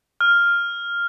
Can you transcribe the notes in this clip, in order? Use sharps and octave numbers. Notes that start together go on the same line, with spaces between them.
F6